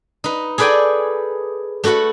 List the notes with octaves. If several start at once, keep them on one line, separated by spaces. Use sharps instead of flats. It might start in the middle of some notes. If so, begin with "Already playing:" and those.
D#4 B4
G#4 A4 B4 D5 G5 G#5
A3 F#4 A4 B4 F#5